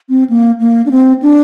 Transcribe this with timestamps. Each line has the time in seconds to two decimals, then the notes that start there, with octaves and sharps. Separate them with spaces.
0.09 C4
0.30 A#3
0.60 A#3
0.86 D4
0.91 C4
1.22 D4